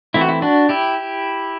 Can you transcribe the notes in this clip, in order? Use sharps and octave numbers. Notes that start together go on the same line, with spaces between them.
E3 A3 C4 E4
F#4
E4
D4 F#4
E4 G4